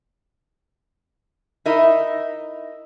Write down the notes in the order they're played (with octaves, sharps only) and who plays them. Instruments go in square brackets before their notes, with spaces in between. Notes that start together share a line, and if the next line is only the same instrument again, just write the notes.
[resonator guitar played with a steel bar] D#4 E4 A#4 D#5 E5